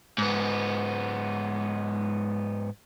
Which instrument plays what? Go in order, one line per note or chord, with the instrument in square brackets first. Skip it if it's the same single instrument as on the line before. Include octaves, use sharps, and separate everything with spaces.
[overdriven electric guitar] G#2 B3